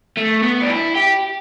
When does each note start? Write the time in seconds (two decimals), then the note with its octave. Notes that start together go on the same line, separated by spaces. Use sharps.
0.17 A3
0.43 B3
0.62 D4
0.69 E4
0.95 G4